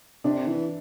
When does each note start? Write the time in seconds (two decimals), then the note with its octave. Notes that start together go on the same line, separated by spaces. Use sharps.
0.24 C3 D4
0.47 E3